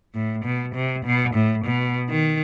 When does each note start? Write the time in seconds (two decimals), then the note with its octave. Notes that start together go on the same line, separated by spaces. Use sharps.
0.15 A2
0.45 B2
0.75 C3
1.05 B2
1.34 A2
1.65 B2
2.09 D#3